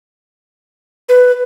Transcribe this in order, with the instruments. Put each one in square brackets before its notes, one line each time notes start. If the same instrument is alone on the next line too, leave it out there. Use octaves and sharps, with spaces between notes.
[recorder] B4